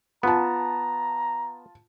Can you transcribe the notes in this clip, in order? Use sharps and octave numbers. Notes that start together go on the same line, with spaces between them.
B3 F4 A5 A#5